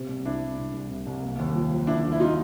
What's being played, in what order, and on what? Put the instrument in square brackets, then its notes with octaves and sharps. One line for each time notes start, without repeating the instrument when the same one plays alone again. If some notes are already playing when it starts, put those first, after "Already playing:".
Already playing: [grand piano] C3
C2
[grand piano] C2 [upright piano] D4 E4
[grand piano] C2
C3
C2
C3
C2
A#3
D#2
F3
F3
[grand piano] D3 [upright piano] D4 E4
[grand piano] F3
[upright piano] E4
[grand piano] D3 [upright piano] D#4 F4